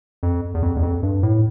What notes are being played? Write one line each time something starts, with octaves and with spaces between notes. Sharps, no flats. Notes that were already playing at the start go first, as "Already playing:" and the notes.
F2
E2
F2
E2
F2
G2
A2